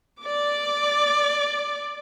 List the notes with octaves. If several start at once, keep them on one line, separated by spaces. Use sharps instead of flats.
D5 D6